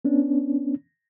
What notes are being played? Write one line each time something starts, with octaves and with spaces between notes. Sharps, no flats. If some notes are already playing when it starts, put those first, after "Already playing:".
B3 C#4 D4